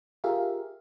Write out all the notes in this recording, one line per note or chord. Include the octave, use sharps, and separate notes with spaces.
F4 G4 G#4 A#4 E5 F5